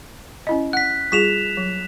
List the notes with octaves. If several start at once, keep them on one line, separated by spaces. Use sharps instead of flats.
C#4 E4 D#5
F#5 F#6 B6
G3 F4 G#4 B6 E7 F7
F#3